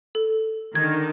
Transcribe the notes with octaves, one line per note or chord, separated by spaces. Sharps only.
A4
D3 D#3 G#6